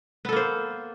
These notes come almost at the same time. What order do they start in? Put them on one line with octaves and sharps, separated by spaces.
B3 A4 A#3 C5